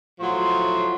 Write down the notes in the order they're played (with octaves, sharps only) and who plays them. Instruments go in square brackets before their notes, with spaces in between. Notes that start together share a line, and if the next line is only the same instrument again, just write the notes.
[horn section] A2 F3 F#3 C6